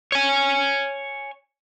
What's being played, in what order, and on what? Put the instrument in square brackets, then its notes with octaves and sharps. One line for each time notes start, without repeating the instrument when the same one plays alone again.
[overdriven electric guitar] C#5 G#5